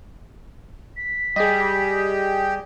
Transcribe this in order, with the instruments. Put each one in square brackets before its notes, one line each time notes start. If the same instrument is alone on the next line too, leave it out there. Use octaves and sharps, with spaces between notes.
[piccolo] B6
[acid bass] G3 [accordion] G4 [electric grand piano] G#4 D#5